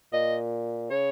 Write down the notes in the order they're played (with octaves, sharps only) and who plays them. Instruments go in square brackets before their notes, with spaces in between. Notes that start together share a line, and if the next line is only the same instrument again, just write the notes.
[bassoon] A#2 [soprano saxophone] D#5
[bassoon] C#3 [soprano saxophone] C#5